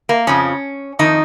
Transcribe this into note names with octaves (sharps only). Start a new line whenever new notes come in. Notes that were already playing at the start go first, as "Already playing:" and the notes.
A#3
F2 C#3 F3 C#4
F2 D#3 D#4